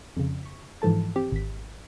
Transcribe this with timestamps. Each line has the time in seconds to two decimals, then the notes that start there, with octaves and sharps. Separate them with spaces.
0.17 F2 C#3
0.43 C#6 B6
0.82 G#2 E3 F3 A4 A5
1.16 C4 G4
1.32 G#1 B6